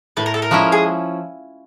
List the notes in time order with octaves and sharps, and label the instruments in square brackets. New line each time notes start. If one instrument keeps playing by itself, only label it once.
[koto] A2 [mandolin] B4
[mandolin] A#4
A4
A#4
[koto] F3 G#3 C#4 E4
[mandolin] G#4